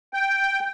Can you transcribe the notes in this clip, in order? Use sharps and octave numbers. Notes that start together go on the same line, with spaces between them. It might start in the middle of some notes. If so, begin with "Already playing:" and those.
G5